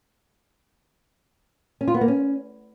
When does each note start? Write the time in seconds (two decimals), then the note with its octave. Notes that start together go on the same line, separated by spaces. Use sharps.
1.81 C#4
1.88 F4
1.94 B3
2.01 A#3
2.08 C#4